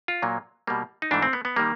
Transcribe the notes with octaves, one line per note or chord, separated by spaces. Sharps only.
F4
A#2 F#3 A#3
B2 G3 A#3
D#4
G#2 E3 A3 D4
C4
B3
B3
D#3 G3 A#3